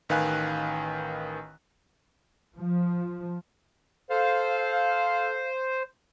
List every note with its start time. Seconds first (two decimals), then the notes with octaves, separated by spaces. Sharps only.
0.09 A1 D#3 B4 F5 G#5 F#6
2.57 F3
4.10 A4 C5 F5